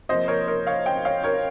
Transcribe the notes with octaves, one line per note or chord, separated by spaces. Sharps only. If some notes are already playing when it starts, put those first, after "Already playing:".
C3 F3 A#3 C5 D#5
A#4 C#5
A#4 C#5
C#5 F5
D#5 G5
C#5 F5
A#4 C#5